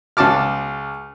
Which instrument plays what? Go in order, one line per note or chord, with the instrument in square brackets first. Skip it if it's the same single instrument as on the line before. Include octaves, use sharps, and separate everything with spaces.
[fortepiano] C#2 F#4 A5 D6 F6